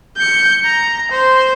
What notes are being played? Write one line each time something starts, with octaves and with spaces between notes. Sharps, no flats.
G6 C#7
A#5
C5